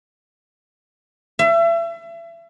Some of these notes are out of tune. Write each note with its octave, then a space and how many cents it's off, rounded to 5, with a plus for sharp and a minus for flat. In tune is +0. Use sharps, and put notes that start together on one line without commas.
E5 +35